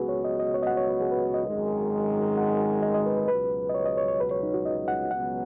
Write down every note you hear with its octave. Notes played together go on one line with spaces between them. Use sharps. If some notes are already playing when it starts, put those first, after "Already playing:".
Already playing: C#2 B2 B3 F#4 G#4 B4
C#5
D#5
D#5
C#5
D#5
F#5
C#5
B4
G#4
B4
D#5
G#1 F#2 D#3 G#3
F#5
D#5
D#5
B4
B4
C#2 B2 F#3 B4
D#5
C#5
D#5
C#5
C#5
B4
C#5
D#4
F#4
D#5
F#5
C#2 B2 F#3 B3 F#5